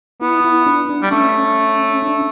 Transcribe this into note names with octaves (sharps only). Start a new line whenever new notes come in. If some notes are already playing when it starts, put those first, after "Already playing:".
B3 E4
E4
D4
D4
G3
A3 C#4
D4